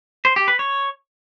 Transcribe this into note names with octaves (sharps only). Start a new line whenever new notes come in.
C5
G4
B4
C#5